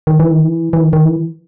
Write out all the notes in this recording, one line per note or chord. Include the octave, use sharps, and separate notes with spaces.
D#3
E3
D#3
E3
E3
D#3
D#3
E3